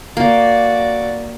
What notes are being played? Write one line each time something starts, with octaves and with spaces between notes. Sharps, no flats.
A#3 F#4 D5